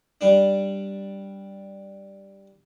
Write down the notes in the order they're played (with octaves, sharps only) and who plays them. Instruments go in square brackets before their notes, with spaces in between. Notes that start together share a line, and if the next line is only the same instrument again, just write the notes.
[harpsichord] G3 D4